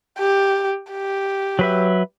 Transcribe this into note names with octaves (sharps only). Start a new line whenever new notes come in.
G4
G4
F#3 B4 E5